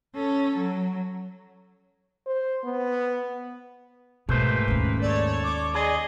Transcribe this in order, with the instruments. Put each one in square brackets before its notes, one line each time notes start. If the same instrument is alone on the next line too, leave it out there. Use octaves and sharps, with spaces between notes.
[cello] C#4 A4
F#3
[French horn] C5
B3
[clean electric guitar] G#2 A3 C5 [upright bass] B2 [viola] A#3 B4
[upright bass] D#2 C#4
[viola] A4 C#5 [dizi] D5
[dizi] D6
[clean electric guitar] G#4 [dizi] D5 [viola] D#5